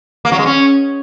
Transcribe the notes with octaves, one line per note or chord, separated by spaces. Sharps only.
A#3
F#3
G#3
C#4